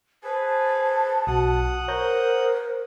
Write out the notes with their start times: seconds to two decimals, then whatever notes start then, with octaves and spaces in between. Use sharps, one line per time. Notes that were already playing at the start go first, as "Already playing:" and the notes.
0.24 G#4 B4 C5 A5
1.27 B1 F#4 F#5 D#6
1.88 A#4 C5 C#5 A#5 G6